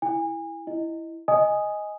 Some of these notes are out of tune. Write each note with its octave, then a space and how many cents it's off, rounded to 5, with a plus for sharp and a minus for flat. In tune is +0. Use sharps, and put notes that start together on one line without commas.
E4 +0 G#5 -30
E4 +0 D#5 +0
D#5 +0 G#5 +0 D#6 +0